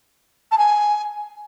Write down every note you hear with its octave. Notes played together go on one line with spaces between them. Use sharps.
A5
G#5